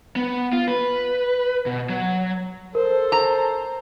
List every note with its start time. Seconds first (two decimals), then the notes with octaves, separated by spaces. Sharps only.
0.16 B3
0.52 F4
0.67 B4
1.66 B2
1.89 F#3
2.75 A4 A#4 C5
3.12 A#5